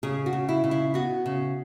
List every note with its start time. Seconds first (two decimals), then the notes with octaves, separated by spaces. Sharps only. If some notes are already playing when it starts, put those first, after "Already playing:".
0.03 C#3 G#4
0.26 F#4
0.33 C#3
0.49 E4
0.64 C#3
0.71 E4
0.94 B3 F#4
1.26 C#3